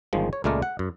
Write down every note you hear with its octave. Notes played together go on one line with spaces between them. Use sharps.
G1 D#3 F3 G#3
C#5
C#2 A#2 G#3 A3 A#4 D5
F#5
F#2